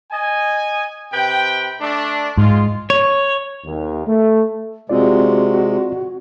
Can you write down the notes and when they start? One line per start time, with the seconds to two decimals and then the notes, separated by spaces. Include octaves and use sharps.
0.11 D#5 G#5
1.12 C3 B4 G5
1.80 A3 D4
2.38 G#2 G#3 F4
2.90 C#5
3.65 D#2
4.07 A3
4.89 C3 G#3 C4 F4 F#4 D5